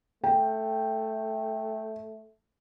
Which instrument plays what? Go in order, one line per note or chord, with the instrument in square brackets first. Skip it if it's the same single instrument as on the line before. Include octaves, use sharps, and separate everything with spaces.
[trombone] A3 [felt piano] G5